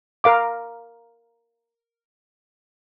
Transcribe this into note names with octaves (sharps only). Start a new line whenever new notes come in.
A#4 F5 D6